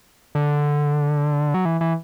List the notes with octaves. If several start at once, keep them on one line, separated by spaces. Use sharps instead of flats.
D3
F#3
E3
E3